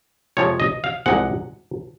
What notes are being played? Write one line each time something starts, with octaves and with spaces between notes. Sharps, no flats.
F2 C3 F3 G#3 C#5
D#5
F5
C2 C3 F3 G#3 F#5